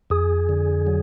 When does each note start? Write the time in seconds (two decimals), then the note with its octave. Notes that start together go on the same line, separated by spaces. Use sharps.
0.10 F2 G#4
0.49 D3
0.87 F#3